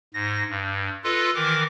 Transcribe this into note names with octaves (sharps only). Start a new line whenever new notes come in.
G#2 A#6
G2
F4 A4 B4 D#5
D#3 E3 A#4 D6